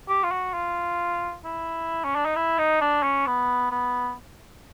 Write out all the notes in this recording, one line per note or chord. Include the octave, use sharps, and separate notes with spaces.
G4
F4
F#4
F4
E4
C#4
D4
D#4
E4
D#4
D4
C#4
B3
B3